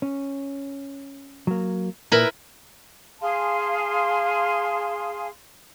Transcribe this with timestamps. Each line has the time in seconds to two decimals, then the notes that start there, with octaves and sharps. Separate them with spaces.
0.02 C#4
1.47 F#3 A#3
2.12 A#2 E4 A#4 B4
3.21 G#4 F5 A5 C6